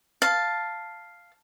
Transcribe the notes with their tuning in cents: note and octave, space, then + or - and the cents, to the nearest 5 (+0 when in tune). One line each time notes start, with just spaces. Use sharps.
F5 +0 A5 +0